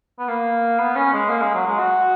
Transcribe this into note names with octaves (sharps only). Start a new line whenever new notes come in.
B3
A#3
B3
C#4
G#3
A#3
G#3
F#3
G#3
F#4